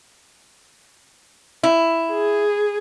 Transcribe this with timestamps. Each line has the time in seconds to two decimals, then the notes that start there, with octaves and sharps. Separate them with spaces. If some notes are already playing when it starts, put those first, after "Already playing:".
1.63 E4
2.12 G#4